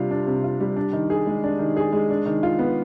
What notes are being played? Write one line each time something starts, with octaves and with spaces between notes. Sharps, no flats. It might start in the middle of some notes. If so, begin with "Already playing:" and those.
Already playing: C3 G3 D4 F4
D4
C3
F4
G3
D4
D#3
G#4
G#3
D4
D#3
G#4
G#3
D4
D#3
F4
B3